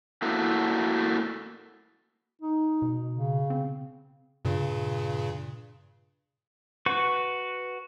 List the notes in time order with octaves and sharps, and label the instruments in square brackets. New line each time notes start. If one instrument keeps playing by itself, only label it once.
[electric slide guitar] A3 A#3 E4 F#4
[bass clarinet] D#4
[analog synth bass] B2
[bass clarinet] C#3
[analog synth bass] C4
[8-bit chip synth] G2 A#2 C#3
[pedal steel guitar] F#4 B4 C#6